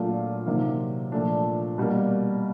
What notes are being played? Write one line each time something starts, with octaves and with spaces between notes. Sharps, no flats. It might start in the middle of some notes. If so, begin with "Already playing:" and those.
Already playing: A#2 F#3 A3 D4 F4
C3 D#3 F#3 A#3
A#2 F3 A3 D4
B2 G3 A#3